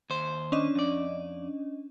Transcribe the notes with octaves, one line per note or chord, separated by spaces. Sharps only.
D#2 C5
C#4 D4 D#5
F2 D5